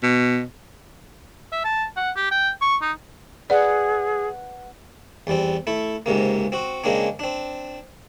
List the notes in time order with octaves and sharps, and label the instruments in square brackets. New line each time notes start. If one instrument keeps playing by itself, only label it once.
[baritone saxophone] B2
[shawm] E5
A5
F#5
G4
G5
C#6
D#4
[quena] G#4 [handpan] B4 F#5 [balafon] D5
[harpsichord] E2 G3 C4
A3 E4
C#2 G#2 C3 A#3
C4 F#4
C#3 G#3 A#3 C4 D4
C4 D4